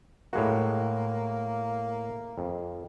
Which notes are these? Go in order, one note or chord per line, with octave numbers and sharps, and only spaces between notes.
A2 G#3 A#3 F#4
F2